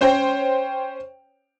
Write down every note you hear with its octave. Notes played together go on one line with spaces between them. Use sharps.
C#4 C5 C#5 G5